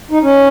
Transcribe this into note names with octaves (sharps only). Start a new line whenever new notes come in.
D#4
C#4